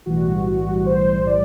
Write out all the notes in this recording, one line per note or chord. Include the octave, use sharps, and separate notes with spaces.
B1 A2 E3 G3 F#4
F#4
C5
D5